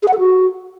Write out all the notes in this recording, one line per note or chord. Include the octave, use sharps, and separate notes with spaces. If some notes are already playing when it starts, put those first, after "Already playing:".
G#4
F#5
A4
F#4